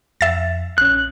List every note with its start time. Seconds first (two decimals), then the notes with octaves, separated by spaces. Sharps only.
0.21 F2 E5 A6
0.78 A#1 C#4 F#6